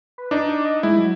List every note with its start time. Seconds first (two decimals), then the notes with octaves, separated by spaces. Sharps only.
0.18 B4
0.31 D4 D#4 D6
0.65 D#5
0.83 G#3 E4
0.98 F#3